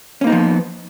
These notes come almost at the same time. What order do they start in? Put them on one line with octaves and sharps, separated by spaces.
C#4 A#3 D#4 B3 F3